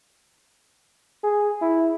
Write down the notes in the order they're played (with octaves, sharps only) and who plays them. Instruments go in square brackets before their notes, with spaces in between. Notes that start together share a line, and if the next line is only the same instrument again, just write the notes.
[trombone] G#4
E4